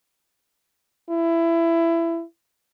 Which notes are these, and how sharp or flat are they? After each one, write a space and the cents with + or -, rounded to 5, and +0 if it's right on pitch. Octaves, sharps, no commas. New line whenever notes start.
E4 +20